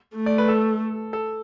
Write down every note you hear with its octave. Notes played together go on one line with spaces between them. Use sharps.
A3
D5
B4
A4
A4